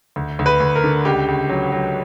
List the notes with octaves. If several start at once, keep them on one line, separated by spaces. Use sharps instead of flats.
D2
D2
B4
D2
A#4
D3
C#2 G4
C#2
F#3
F#3